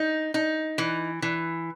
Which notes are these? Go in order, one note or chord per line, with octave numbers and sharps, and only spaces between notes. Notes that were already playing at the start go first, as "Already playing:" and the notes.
Already playing: D#4
D#4
E3
E3